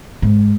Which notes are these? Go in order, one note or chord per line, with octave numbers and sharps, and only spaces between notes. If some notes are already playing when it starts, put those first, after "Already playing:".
G#2